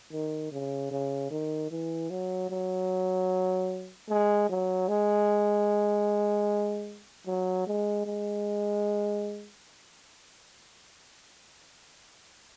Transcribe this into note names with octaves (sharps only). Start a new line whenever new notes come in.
D#3
C#3
C#3
D#3
E3
F#3
F#3
G#3
F#3
G#3
F#3
G#3
G#3